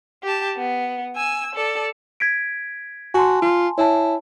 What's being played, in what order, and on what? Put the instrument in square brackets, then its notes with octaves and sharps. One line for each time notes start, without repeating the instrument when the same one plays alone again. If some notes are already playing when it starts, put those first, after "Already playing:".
[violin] G4 A5
B3
G#5 E6
A4 D5
[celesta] G#6 B6 D7
[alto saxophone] F#4 [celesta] G#5 A5 C6
[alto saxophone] F4
[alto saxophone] E4 [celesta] C#5 G#5 A5